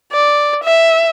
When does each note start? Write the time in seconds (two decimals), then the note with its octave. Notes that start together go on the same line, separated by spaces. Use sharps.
0.12 D5
0.63 E5